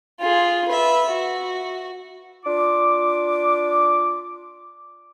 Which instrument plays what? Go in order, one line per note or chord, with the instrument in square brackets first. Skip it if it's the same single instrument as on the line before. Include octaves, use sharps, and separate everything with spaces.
[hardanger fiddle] F4 G#4
B4 E5
F#4
[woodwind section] D4 F4 D6